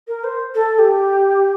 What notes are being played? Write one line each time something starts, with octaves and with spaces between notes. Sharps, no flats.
A#4
C5
A4
G4